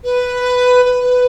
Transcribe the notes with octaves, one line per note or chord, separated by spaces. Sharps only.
B4
B4